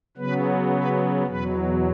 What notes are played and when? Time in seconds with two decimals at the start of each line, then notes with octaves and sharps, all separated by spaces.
0.17 C#3 F#3 B3 B4
0.72 B4
1.27 E2 B2 F#3 B4